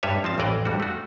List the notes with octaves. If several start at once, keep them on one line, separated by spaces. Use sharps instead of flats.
G2 G3 B4 C#5 E5
F3 C4 A5
A1 F2 E3 A#4 D5 D#5
F2 G3 F#4
A3 F#4